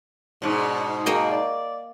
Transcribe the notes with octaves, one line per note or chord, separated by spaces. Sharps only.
G#2 B2 D4 D5
A#3 D#4 F#4 G#4 D#5 G5
D5